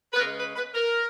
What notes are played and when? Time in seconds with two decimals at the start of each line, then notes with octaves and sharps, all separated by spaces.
0.13 B4
0.19 C#3 G#3 A#4
0.38 B4
0.56 B4
0.74 A#4